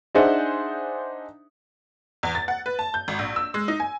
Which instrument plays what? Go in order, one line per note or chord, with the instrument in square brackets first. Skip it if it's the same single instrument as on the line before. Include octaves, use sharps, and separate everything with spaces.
[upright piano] D4 D#4 G#4 C5 E5 F#5
[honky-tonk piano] E2
A6
F#5
B4
A5
G6
G#1
A#1
E6
G#3
D#4
G#5